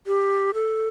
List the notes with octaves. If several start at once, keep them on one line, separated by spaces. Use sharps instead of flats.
G4
A4